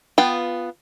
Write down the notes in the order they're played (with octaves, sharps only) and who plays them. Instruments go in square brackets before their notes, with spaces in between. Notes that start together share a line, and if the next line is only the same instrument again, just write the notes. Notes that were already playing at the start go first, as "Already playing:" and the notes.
[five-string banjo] B3 F4 G5